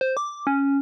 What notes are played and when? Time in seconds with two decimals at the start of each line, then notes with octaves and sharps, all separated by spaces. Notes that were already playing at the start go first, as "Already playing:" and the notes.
0.01 C5
0.17 D6
0.47 C#4